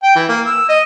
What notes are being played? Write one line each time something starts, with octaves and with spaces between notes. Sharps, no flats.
G5
E3
A#3
E6
D#5